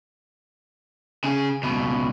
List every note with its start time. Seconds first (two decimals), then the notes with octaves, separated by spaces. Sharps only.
1.24 C#3 G#4
1.63 C#2 B2